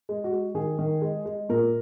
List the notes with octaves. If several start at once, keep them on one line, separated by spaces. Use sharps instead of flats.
G#3
F#4
G#3
D#3 G#4
D#3
G#3
G#3
A#2 A#4